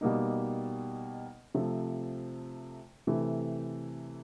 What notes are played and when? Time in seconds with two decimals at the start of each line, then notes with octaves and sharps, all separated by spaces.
0.01 B2 G3 A#3 D#4
1.54 C3 F3 A3
3.07 C3 E3 A3